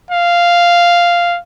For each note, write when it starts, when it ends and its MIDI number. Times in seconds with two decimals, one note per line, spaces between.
0.11 1.38 77